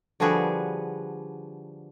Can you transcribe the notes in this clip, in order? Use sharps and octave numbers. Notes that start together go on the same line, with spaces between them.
D3 F3 G3 F#4 G#4 B4